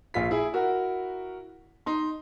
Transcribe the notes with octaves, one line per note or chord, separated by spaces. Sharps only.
A#1 F4 B6
E4 G#4
E4 F#4 A#4
D#4 C6